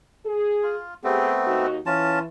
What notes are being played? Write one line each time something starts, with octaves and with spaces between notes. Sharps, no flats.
G#4
F4
A3 B3 C4 G4 G#4
D#2 D#4 F#4
E3 C#4 F4 A5